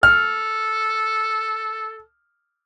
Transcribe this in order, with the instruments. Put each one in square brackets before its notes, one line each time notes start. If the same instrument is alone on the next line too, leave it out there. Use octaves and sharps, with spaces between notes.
[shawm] A4 [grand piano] F6